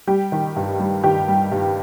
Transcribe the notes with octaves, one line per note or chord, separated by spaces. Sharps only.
G3 G4
D#3
G2
G3
D#3 G4
G3
G2